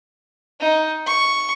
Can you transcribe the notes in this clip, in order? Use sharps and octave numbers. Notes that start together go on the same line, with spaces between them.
D#4
C#6